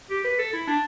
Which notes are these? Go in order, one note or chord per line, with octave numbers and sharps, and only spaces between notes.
G4
B4
A4
E4
D4